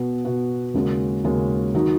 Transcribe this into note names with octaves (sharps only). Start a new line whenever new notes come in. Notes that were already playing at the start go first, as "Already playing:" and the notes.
Already playing: B2 B3 F#4
B2 B3 F#4
D#2 C#3 G#3 C#4 F#4
D#2 C#3 G#3 C#4 F#4
D#3 F#3 D#4 F#4